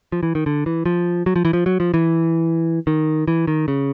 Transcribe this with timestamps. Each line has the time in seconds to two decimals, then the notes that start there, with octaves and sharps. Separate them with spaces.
0.12 F3
0.23 E3
0.35 D#3
0.46 D3
0.66 E3
0.86 F3
1.26 F#3
1.36 F3
1.45 E3
1.53 F3
1.66 F#3
1.80 F3
1.94 E3
2.87 D#3
3.28 E3
3.48 D#3
3.68 C#3